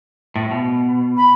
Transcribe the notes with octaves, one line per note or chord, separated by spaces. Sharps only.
A2
B2
B5